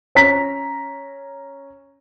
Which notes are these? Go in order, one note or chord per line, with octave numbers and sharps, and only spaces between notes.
C#4 A#5 B6